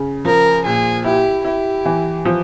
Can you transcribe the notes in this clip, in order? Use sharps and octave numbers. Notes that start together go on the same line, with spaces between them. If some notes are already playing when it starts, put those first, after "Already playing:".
Already playing: C#3
F3 A#4
A#2 G#4
E4 G4
E4 G4
E3
F3